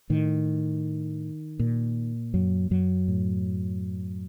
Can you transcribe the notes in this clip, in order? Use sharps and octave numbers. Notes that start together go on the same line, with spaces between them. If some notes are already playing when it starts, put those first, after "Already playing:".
A2 D#3
A#2
F#2 F#3
F#2 F#3
A2